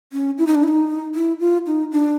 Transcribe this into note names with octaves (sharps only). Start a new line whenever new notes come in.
C#4
E4
D#4
D4
E4
D#4
E4
F4
D#4
D4